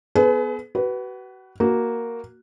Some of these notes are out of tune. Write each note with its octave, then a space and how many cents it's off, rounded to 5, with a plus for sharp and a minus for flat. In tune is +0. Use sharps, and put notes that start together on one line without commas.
B3 +0 G#4 +40 B4 +30
F#4 +35 B4 +0
A#3 +0 F#4 +0